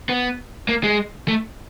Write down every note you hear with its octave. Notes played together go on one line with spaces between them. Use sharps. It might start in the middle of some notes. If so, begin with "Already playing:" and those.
B3
A#3
G#3
A3